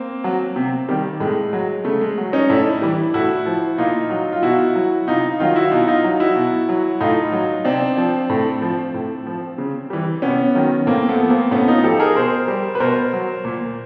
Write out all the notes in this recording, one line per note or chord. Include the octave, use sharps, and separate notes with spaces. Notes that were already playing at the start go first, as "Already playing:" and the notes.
Already playing: A#3 C4
F#3
C3
D#3 G3
A2 G#3
F#3
C#3 A3
G#3
F#3
C#4 D#4
A2 D4 E4
E3 G3
A2 E4 F#4
F3
A#2 D#4 F4
F#3
F4
B2 E4 F#4
F#3
C3 D#4 F4
D#3 F#3 D#4 F4
E4 F#4
B2 D#4 F4
D#4 F4
F#3
E4 F#4
B2
F#3
A2 D#4 F4
F#3
C3 C4 D4
F3
A2
F3
A2
F3
C#3
E3 G3
C3 B3 C#4
D#3 F#3
A2 A#3 C4
A3 B3
F3
A#3 C4
A2 B3 C#4
D#4 F4
F3 G4 A4
G#4 A#4
B2 A#4 C5
G3
B4
B2 A#4 C5
F#3
A#2